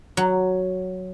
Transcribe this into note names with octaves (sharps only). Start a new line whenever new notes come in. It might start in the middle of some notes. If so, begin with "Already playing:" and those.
F#3